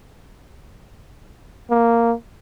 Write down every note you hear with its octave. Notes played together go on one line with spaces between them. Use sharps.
A#3